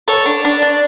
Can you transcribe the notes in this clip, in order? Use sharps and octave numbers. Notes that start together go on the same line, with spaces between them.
A4 C#5
D4
D4
D4